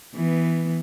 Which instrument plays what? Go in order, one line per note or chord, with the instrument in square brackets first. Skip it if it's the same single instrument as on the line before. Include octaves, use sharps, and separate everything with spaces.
[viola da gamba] E3 B3